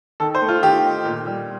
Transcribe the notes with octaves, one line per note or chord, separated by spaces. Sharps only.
D#3 A4
C5
A3
F4
D#3 G4
D#4
A#2
G3